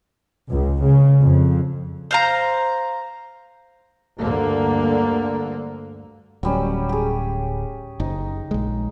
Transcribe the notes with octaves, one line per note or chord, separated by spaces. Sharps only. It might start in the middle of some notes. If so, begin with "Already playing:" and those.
C#2
C#3
F2
C5 F5 A#5
D2 G2 D3 A#3
D1 F#3 G3 C#4
G4 G#4
F#1 D#4
A#1 G#3